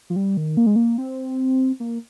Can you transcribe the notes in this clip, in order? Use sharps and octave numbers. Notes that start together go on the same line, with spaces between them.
F3
G3
D#3
A#3
G#3
A#3
C4
A#3